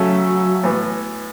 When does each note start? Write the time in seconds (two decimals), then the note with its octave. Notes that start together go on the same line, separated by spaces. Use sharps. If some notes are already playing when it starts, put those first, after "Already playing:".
Already playing: C#3 F#3 A3 C#4 A4
0.63 A2 E3 B3